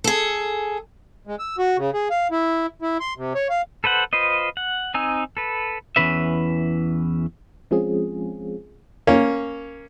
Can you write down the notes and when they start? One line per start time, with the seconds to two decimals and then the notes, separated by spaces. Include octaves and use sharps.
0.04 G#4 A4
1.27 G#3
1.39 E6
1.58 F#4
1.77 C#3
1.94 G#4
2.10 F5
2.31 E4
2.82 E4
3.00 C6
3.17 C3
3.35 C#5
3.50 F5
3.84 A4 B4 C5 F#5
4.13 F4 B4 C5 D#5
4.57 F#5
4.94 C4 D#4 G#5 E6
5.37 A4 B4
5.96 E2 E3 C#4 B4 E5
7.71 F3 G#3 C4 C#4 F4 G#4
9.07 A#3 C#4